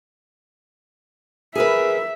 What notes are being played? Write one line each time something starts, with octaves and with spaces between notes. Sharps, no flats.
G#4 A#4 B4 E5